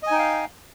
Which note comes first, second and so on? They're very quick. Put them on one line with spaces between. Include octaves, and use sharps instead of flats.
D#5 G#5 D#4 G5 F5